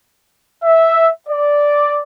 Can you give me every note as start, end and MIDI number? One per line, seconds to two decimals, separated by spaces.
0.63 1.08 76
1.29 2.01 74